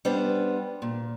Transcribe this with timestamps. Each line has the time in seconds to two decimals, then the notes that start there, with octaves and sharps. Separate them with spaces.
0.05 G3 B3 D4 C5
0.82 A#2